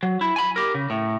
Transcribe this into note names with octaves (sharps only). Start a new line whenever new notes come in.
F#3
E4
G#5 B5
G4 A#4
C#3
A2